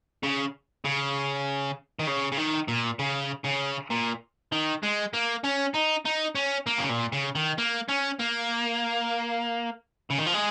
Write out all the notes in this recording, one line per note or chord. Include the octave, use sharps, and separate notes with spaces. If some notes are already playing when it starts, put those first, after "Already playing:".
C#3
C#3
D#3
C#3
C#3
D#3
A#2
C#3
C#3
A#2
D#3
G#3
A#3
C#4
D#4
D#4
C#4
A#3
C#3
A#2
C#3
D#3
A#3
C#4
A#3
C#3
D#3
F3
G#3